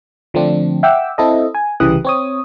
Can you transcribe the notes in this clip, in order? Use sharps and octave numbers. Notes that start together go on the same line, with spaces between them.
D3 F3 A3 C4 D4
E5 F#5 G5 D6 E6
C4 E4 A4 D#5
G#5
C2 C#3 E3 G4 D#6 F#6
C4 C#5 D#6